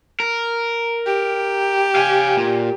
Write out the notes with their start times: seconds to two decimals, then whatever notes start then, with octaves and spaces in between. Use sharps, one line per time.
0.20 A#4
1.06 G4
1.96 F5 G#5
2.37 A#2